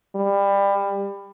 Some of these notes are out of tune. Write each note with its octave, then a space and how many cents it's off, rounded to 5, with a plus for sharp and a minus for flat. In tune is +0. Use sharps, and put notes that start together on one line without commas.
G3 +25